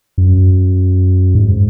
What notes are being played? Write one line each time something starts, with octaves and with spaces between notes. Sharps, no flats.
F#2
G#2